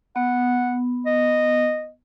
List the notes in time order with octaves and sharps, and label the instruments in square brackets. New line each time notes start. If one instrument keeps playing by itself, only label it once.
[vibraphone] B3 [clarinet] F#5
[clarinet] D#5